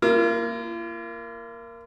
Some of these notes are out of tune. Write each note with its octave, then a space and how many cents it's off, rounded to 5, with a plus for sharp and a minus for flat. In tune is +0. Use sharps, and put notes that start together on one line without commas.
A#3 +0 F4 -45